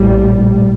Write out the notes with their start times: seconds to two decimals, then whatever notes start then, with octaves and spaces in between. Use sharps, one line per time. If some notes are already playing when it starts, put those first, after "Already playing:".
Already playing: A#1 A2 G3